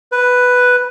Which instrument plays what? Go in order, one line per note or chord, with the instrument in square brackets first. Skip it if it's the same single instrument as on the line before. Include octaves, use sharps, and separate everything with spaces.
[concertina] B4